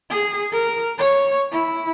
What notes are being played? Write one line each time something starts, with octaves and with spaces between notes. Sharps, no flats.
G#4
A#4
C#5
E4